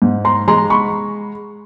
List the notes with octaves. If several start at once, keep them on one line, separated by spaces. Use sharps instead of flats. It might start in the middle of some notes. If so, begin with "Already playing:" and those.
G#2
A#5 C6
G#3 A#5 C6
B5 C#6